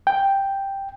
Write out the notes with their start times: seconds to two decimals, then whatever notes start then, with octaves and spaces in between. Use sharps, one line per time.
0.07 G5